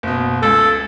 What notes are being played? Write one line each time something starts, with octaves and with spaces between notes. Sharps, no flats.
F#1 B2
C#2 A4